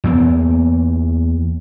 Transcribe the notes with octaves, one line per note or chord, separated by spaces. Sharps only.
E2 A#3 B3